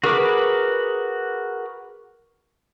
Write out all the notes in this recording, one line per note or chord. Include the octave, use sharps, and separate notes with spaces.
F#4 G#4 A#4 B4 D6